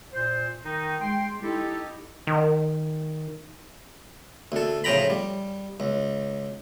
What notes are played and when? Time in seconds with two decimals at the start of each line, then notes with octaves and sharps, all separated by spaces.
0.12 A#2 C5
0.64 D#3 D#4
1.00 G#3 G5 C6
1.42 D#4 E4 G4 A4
2.27 D#3
4.52 D2 A4
4.84 A2 C#3 F3 G5 A#5 B5
5.10 G3
5.80 C#2